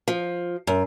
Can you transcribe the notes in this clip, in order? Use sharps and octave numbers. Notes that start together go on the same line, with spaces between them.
F3
F#2